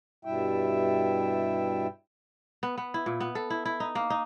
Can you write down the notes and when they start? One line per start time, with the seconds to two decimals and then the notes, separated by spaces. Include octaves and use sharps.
0.25 G2 B2 G3 E4 E5 G5
2.63 B3
2.78 B3
2.94 E4
3.06 A#2
3.20 B3
3.35 A4
3.50 E4
3.66 E4
3.80 D#4
3.95 A#3
4.10 D#4